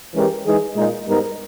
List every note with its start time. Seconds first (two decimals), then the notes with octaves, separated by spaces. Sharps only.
0.14 E3 G#3 C#4 G4 A#4
0.46 E3 G#3 D#4 G#4
0.76 A#2 G#3 D#4
1.07 G#2 G3 B3 D#4 A#4